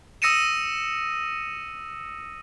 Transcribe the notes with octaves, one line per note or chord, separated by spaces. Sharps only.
D#6 E6 A#6 C#7 D#7 E7